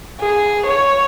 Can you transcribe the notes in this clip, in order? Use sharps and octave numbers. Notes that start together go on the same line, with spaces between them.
G#4
C#5